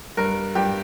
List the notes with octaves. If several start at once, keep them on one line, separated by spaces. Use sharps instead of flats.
G2 A#4
G2 G4